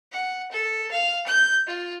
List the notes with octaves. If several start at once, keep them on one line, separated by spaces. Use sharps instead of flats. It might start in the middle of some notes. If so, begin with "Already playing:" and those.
F#5
A4
F5
G6
F4